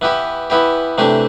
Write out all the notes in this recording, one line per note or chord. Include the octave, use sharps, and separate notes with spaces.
E3 B3 E4 G4
E3 B3 E4 G4
C3 E3 A3 D4 G4